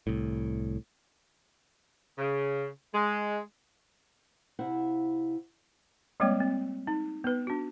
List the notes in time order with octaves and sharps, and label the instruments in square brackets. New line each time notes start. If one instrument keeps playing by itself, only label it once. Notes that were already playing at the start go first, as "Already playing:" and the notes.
[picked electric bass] C2 A2
[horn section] C#3
G#3
[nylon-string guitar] C3 E4 C5 F5 F#5
[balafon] G3 G#3 A#3 C4 C#5 G5
C4
D#4
B3 B4
D4 F#4